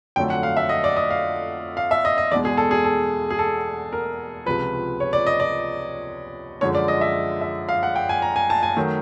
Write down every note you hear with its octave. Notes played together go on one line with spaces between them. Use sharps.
F2 D3 F#3 A3 G5
F#5
F5
E5
D#5
D5
D#5
F5
F5
E5
D#5
D#5
E2 B2 G#3 D5
G#4
A4
G#4
A4
G#4
A4
A#4
C#2 C3 F3 B4
C#5
D5
D#5
D5
F#2 D3 F3 G#3 C#5
D5
D#5
E5
E5
F5
F#5
G5
G#5
A#5
G#5
A5
G#5
D#3 F#3 A3